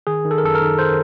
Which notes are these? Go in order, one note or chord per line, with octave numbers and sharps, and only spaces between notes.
D#3 G#4
D#3
A4
A#4
F#2 A4
A#4
D#3
C5